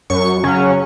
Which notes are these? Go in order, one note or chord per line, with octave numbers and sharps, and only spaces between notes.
F#2 C#6
C#3 F#3 C#4